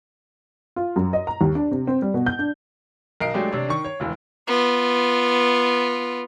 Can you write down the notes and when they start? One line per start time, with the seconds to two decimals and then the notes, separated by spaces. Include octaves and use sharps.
0.76 F4
0.96 F#2
1.13 D#5
1.27 A#5
1.41 D#2
1.55 D4
1.71 C3
1.87 C4
2.02 G3
2.14 B2
2.26 G6
2.39 D4
3.21 B1 A#4 D#5 C7 D7
3.34 F#3 G#3 A3 D4 G4
3.52 C3 D4 C#5
3.68 D#3 C#6
3.85 C#5
4.00 E1 C#2 E3
4.48 B3 F4